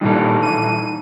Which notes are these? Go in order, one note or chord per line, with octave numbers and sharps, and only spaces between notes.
A#2 D#3 E3 G3 A4
D#7